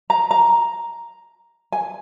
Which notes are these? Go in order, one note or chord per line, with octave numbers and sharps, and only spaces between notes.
A#5
A#5
G#5